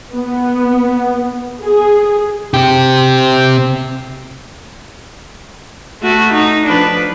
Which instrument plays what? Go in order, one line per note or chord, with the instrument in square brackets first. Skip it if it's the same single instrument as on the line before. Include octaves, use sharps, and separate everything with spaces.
[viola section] B3
G#4
[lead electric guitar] C4 G4
[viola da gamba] A3 F#4
D#4
F3 D4 B4